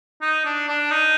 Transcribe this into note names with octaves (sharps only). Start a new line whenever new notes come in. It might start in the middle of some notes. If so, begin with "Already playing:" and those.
D#4
D4
D4
D#4